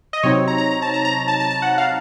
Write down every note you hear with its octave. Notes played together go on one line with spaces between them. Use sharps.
D#5
C3 F#3 C4 D#4 C#5
A#5
A#5
A#5
A5
A#5
A#5
A5
A5
A5
F#5
F5